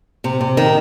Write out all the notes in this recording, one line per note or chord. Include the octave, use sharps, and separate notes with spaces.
C3
C3
D#3